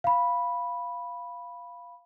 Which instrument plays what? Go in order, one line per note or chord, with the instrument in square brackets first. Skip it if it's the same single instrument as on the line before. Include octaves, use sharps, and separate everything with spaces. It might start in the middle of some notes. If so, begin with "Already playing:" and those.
[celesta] F5 B5